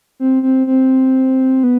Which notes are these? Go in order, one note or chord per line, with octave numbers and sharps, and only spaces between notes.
C4
C4
C4
B3